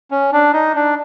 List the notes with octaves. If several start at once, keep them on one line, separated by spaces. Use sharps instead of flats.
C#4
D4
D#4
D4